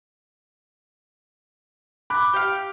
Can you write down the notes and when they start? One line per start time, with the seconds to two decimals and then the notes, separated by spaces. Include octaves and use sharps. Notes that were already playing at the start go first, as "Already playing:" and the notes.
2.10 B5 D6 F#6
2.33 G4 F5